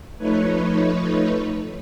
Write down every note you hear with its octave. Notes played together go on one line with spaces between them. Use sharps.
F3 A3 D#4 B4 C#5